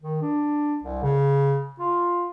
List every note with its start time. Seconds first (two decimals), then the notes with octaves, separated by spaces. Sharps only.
0.02 D#3
0.22 D4
0.84 C2
1.03 C#3
1.79 F4